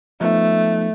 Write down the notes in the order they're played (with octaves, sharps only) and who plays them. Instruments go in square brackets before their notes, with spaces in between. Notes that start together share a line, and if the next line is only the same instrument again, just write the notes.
[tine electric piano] F3 B3 D#4 [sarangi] A3